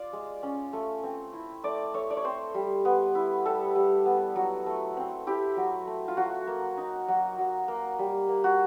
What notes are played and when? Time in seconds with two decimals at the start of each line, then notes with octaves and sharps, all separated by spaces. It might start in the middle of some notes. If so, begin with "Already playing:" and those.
Already playing: F4 D5
0.13 G#3
0.43 C#4
0.73 A3
1.04 C4
1.33 E4
1.64 A3 D5
1.94 A3 C#5
2.10 D5
2.17 C#5
2.24 C4 C5
2.54 G3
2.85 B3
3.15 E4
3.45 G3 A4
3.75 G3
4.06 B3
4.36 F#3
4.66 A3
4.97 C4
5.27 E4 G4
5.57 F#3
5.87 A3
6.08 F4
6.17 F#3 F#4
6.47 A#3
6.77 D#4
7.08 F#3
7.38 F#3
7.68 A#3
7.99 G3
8.29 A#3
8.44 F#4